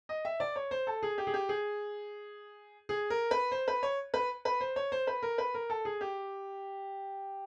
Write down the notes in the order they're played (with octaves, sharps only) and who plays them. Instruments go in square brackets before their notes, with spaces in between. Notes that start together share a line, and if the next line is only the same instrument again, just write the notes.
[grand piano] D#5
E5
D5
C#5
C5
A4
G#4
G4
G#4
G4
G#4
G#4
A#4
B4
C5
B4
C#5
B4
B4
C5
C#5
C5
B4
A#4
B4
A#4
A4
G#4
G4